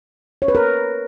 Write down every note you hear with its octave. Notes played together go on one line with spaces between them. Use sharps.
C#5
B4
A#4